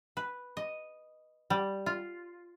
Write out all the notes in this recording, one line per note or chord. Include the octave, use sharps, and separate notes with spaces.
B4
D#5
G3
F4